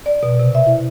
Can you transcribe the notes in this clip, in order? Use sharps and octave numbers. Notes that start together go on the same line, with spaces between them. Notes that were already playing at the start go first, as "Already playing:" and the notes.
D5
B2
C3
E5
E4